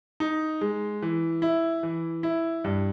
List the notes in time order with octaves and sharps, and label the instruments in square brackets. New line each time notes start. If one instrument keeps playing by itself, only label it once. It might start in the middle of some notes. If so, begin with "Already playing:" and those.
[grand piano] D#4
G#3
E3
E4
E3
E4
G2